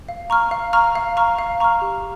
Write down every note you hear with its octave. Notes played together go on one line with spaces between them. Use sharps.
F5
A#5 C#6 F6
F5
A#5 C#6 F6
F5
A#5 C#6 F6
F5
A#5 C#6 F6
G4